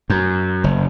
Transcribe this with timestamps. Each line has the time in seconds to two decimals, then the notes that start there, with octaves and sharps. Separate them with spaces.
0.10 F#2
0.64 F#1